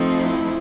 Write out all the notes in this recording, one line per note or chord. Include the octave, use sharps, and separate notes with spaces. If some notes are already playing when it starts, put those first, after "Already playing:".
Already playing: F3 A3 C4 D#4
E4